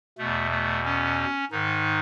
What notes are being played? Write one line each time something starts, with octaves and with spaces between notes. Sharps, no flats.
E2 B2 A3
A3
C#4
G#2 D#3 D#4